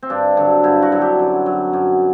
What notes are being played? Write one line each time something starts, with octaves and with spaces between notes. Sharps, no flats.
C4
G2 D4
D3 F#3
G2 E4
F#4
D3 F#3
G4
F#2
F#3
F#2